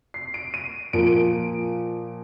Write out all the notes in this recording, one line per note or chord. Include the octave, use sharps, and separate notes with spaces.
C7
D7
D#7
A#2 F3 A#3 D7
D7